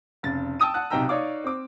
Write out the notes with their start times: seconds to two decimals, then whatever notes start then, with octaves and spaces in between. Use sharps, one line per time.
0.23 F1 C#3 A6
0.60 G5 A5 D#6 E6 D#7
0.74 F#5 A5 F#6
0.90 B1 C3 D#4 G5 A#5 E6
1.09 D#4 C#5 D5 F5 D6
1.44 C4 D6